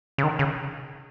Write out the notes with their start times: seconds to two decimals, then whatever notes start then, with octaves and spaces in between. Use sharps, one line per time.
0.18 C#3
0.23 D#3
0.39 C#3